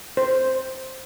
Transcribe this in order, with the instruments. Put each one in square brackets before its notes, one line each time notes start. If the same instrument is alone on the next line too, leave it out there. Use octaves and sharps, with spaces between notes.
[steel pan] C5